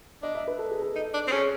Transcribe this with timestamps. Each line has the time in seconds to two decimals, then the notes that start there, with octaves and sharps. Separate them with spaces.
0.23 D4 D#5
0.35 E5
0.47 B4
0.59 A4
0.71 G#4
0.82 A4
0.96 D#4
1.14 D4
1.28 C4
1.32 C#4 G#4